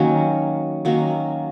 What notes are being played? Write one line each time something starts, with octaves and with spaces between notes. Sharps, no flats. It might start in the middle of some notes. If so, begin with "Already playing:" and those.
Already playing: D#3 F#3 A#3 C#4
D#3 F#3 A#3 C#4